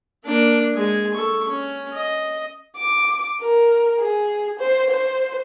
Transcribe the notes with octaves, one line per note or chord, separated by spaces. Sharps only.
A#3 D4
G#3 G#5
A4 C#6
C#4
D#5
D6
A#4
G#4
C5
C5